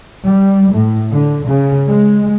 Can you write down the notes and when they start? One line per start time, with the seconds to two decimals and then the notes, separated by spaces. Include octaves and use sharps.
0.24 G3
0.72 A2
1.11 D3
1.47 C#3
1.87 G#3